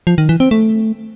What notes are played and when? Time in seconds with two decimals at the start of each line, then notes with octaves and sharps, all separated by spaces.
0.07 F3
0.18 D#3
0.29 E3
0.40 C4
0.51 A3